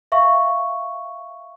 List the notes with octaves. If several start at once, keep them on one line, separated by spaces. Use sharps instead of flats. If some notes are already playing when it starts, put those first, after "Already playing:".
E5 F5 C#6